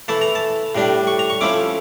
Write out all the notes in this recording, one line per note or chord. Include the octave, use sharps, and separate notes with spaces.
E3 A3 E4 A5
A#5
A5
A2 G3 D4
C#6
A#5
C#6
F3 A3 C#4 E4 D6